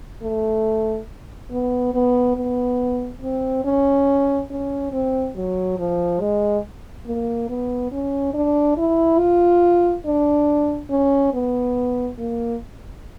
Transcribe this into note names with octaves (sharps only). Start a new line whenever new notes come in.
A3
B3
B3
B3
C4
C#4
C#4
C4
F#3
F3
G#3
A#3
B3
C#4
D4
E4
F4
D4
C#4
B3
A#3